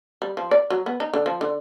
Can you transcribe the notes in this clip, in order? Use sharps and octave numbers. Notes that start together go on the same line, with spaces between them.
G3
F3
D5
F#3
B3
D#4
D3
F3
D3